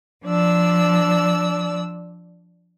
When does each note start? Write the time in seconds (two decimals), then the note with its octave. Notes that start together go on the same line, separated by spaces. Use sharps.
0.24 F3 D4 D5 E6